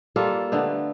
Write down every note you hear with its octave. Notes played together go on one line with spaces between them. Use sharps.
G3 A#3 F4 A4
D3 A3 B3